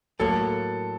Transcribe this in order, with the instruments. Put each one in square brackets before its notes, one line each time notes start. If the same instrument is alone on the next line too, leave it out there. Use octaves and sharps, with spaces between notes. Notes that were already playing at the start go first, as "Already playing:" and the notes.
[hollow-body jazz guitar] A2 F#3 A#3 [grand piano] A4